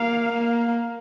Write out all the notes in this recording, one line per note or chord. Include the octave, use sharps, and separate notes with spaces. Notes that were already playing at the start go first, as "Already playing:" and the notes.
Already playing: A#3 F5
A#3